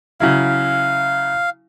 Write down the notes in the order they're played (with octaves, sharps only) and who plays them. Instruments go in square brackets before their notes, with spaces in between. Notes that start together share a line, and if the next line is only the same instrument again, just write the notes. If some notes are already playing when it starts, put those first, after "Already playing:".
[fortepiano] C#3 F#3 E4 [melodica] F5